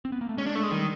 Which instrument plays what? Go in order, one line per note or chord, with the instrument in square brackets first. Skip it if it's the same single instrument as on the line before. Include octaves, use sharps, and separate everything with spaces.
[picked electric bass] C4
B3
A#3
A3
[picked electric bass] G#3 [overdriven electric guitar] C#4
[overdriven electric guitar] D4
A3
G#3
[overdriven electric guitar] D#3 [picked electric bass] G3